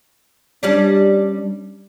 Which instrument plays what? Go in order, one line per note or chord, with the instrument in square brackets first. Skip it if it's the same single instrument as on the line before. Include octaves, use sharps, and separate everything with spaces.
[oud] G3 C#4 D4